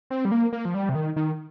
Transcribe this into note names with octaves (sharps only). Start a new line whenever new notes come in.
C4
G3
A#3
A#3
F3
G3
C3
D#3
D#3